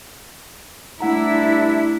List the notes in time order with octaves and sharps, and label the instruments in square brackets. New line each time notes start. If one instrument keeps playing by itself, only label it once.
[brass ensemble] G2 D4 [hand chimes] A3 F#5 A#5 [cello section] E4